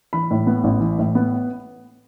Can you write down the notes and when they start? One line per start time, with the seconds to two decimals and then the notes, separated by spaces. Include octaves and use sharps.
0.13 E3 B5
0.31 A2
0.47 B3
0.64 A1
0.80 E3
0.99 A2
1.15 B3